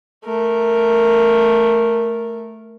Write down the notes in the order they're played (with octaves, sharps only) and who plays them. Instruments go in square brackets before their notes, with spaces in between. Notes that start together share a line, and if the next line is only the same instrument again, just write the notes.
[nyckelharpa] A3 A#4